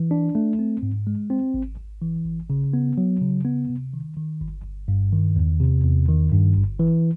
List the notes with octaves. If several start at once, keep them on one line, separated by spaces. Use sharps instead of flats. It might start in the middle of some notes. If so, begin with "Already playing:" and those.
Already playing: E3
D4
A3
C4
G#2
G#3
C4
G#1
G#1
E3
G#1
C#3
B3
F#3
C#3
B3
C3
D#3
D#3
G1
G1
G2
D#3
E2
C3
E2
D#3
G2
G1
E3